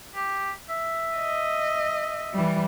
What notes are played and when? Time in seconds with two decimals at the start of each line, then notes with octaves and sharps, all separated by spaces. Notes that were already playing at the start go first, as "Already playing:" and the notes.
0.15 G4
0.69 E5
1.15 D#5
2.33 E3 G3